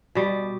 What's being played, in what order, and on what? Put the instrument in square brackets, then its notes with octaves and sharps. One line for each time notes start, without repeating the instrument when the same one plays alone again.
[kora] B2 G3